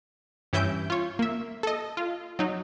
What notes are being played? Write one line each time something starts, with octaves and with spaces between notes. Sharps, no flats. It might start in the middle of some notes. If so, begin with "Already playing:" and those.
G2 E3 C#4 E5 G6 D7
F4 C#5
A#3 E5
A4 D#5
F4
F#3 D#4